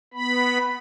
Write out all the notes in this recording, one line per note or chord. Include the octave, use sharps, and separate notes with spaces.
B3 B5